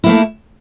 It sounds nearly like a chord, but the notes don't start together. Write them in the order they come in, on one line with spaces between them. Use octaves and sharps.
E4 A#3 A3